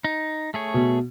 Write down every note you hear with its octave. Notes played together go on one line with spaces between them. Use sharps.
D#4
A3 G#4 C#5
B2